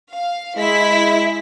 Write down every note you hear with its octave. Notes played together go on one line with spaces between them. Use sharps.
F5
G#3 E4 B6